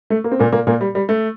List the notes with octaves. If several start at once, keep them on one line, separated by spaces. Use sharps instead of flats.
A3
A#3
C4
A#2 A#3
A#2 A#3
A#2 A#3
G3
G3
A3